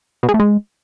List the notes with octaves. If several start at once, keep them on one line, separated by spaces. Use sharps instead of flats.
B2
G#3
A2
G#3